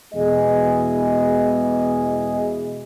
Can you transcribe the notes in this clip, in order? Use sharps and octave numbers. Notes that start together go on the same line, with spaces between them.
E2 B2 E3 G#3 G#4 D#5